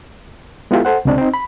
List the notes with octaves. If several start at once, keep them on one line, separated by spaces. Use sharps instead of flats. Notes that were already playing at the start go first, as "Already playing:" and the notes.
G#3 B3 E4 F4 G4 A4
A4 C5 F#5
C#2 C3 C4 D4 D5
C4 D#4
B5